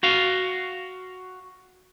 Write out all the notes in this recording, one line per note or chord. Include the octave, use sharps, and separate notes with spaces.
F#4 F5